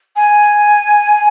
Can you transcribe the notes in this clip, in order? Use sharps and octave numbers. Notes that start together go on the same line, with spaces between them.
G#5